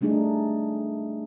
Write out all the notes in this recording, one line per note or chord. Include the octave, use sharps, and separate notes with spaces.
G3 A3 D4 D#4 G#4